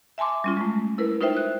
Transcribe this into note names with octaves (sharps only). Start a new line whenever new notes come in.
E5 G#5 A5 C6 D6
G3 C#4 F4
G#3 A3
E4 A#4 B4
D#4 F4 B4 C5 E5 G5
F#6